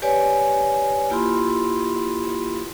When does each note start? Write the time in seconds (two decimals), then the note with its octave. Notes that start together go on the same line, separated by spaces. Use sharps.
0.02 G4 B4 C#5 D5 G#5
1.10 A#3 E4 F4 G4 B5 C6